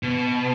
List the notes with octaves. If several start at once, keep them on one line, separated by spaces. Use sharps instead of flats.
B2